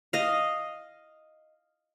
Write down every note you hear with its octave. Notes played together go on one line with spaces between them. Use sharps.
D#5 F5